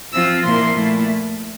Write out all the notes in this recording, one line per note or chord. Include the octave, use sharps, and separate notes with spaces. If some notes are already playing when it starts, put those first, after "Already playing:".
F3 C4 F4 E6
A#2 F3 A#3 E4 C6
A#2 A3 E4